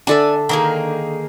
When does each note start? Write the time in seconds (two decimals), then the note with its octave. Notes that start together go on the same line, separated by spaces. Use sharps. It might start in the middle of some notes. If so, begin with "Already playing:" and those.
0.07 D3 D4 A4 D5 E5 G#5
0.49 D#3 A#3 G#4